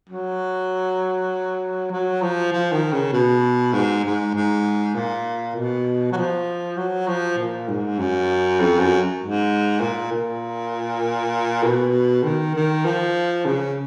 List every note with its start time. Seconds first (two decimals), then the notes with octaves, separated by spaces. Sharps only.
0.09 F#3
1.91 F#3
2.22 F3
2.52 F3
2.72 D#3
2.92 C#3
3.13 B2
3.73 G#2
4.04 G#2
4.34 G#2
4.95 A#2
5.55 B2
6.12 F#3
6.17 F3
6.77 F#3
7.08 F3
7.38 A#2
7.68 G#2
7.99 F#2
8.60 F2
8.79 F#2
9.20 G#2
9.80 A#2
10.12 A#2
11.63 B2
12.23 D#3
12.55 D#3
12.85 F3
13.45 C#3